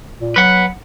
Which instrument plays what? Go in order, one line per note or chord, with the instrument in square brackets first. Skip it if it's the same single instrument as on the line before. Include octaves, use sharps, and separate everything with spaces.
[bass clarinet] A#2
[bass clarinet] F#3 [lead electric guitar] B4 F#5